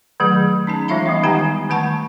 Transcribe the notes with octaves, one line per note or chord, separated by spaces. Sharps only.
D#3 F#3 A3 G#4
C#4 D#4 A5
E3 G#3 F4 E5 F5 B5
G3 B3 D#4
D#3 G4 F#5 G#5 A#5
D#3 A3 F#5 A5 C#6